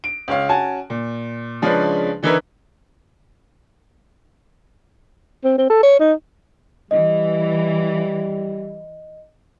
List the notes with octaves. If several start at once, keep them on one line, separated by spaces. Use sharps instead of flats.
D7
C#2 C#5 F5
C#4 F#4 G#5 A5
A#2
C#3 F3 G#3 C#4 D4 B4
D3 E3 D#4 E4 A#4 B4
C4
C4
A4
C#5
D#4
E3 G3 D#5